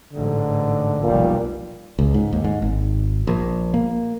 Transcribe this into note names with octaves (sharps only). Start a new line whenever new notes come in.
A1 G#2 D3
F1 B1 A#2 G3
C#2
G#2
D#2
G#2
G#1
A#1
A#3